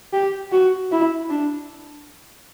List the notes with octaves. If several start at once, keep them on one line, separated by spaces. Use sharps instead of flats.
G4
F#4
E4
D4